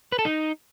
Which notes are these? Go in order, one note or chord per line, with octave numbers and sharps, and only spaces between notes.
B4
A4
D#4